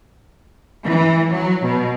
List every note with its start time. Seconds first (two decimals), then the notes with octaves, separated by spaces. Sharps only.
0.86 E3
1.31 F#3
1.64 B2